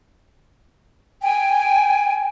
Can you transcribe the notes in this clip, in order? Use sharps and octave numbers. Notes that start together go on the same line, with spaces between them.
G5 G#5